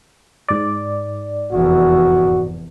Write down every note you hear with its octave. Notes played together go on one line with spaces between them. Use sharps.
G#2 D5
F1 E2 F#4